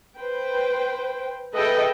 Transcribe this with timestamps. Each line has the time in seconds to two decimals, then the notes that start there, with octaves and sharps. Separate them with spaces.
0.18 B4 C5 G5
1.54 G#4 A4 B4 D#5 E5 G5